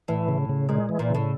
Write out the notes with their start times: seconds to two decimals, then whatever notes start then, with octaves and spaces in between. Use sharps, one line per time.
0.08 A2 E3
0.28 C#3
0.49 C#3
0.69 A#2 G#3
0.89 E3
0.99 A#2
1.10 A2 C#3